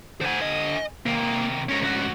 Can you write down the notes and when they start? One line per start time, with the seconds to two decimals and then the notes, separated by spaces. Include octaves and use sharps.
0.21 D3 C5 F#5 G#5
0.42 D#5
1.06 C3 D#3 A#3
1.69 G#2 C#4 A#4 C#5
1.82 D2 F#4